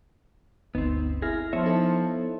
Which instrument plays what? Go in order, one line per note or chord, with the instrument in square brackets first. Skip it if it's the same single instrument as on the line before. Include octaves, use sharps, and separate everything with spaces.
[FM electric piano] G1 D2 D#4 [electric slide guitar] B3 C4
[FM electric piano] E4 F6 A#6 [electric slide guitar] G#4
[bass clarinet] F3 [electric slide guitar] B3 C#5 E5
[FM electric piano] D#4 E4 A4